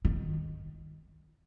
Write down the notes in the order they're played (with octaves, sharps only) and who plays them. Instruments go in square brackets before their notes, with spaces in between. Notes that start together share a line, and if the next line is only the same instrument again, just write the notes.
[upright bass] D#3